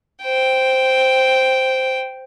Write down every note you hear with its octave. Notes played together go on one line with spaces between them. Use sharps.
C5 G5